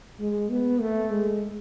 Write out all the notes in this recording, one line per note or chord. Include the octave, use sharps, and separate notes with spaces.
G#3
B3
A3
G#3